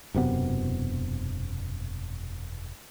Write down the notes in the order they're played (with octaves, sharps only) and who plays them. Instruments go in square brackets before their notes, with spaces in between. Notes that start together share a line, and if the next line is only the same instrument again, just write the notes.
[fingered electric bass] E1 F#2 C3 B3